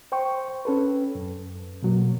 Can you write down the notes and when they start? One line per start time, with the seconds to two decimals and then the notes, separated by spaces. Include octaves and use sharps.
0.12 C5 G5 C#6
0.65 C#4 A4 B4
1.15 F#2
1.83 B2 F#3 A#3